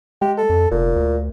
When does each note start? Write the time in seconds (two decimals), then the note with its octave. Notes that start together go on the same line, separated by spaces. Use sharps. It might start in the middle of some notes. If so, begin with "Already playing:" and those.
0.22 G#3 G4
0.38 A4
0.50 F2
0.72 F1 A#2
0.96 D2